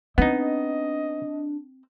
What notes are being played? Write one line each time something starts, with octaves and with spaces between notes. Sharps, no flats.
B3 C4 D4 D#4 D#5